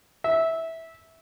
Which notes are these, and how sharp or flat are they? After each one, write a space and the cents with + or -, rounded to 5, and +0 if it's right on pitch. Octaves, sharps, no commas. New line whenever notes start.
E5 -15